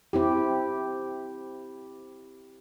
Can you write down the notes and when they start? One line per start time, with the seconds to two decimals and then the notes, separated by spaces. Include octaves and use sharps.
0.13 C4 E4 G4